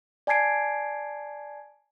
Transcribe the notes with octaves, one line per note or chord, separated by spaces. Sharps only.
D5 G#5 A5 G#6 C7 D7